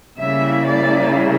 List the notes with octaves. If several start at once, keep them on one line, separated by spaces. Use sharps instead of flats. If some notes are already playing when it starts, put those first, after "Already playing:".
C#3 G3 A#3 E4 E5
D5